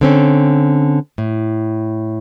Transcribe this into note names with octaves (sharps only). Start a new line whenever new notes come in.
D3 C4 C#4
A2